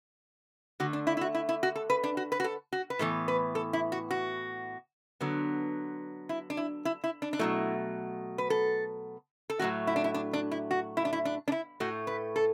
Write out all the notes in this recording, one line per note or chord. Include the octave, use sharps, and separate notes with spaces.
D3 A3 F#4
D4
E4
E4
F#4
E4
E4
F#4
A4
B4
D4
F#4
B4
F#4
A4
F#4
B4
A2 E3 B3 A4
B4
A4
E4
F#4
F#4
D3 F#3 B3
E4
D4
E4
E4
E4
D4
D4
B2 F#3 A3 E4
B4
A4
A4
A2 F#3 A3 F#4
E4
D4
E4
D4
D4
E4
F#4
E4
D4
E4
D4
D4
E4
A2 A3 F#4
B4
A4